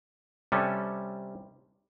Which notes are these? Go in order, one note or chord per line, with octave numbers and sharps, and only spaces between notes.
C3 G3 C#4 A4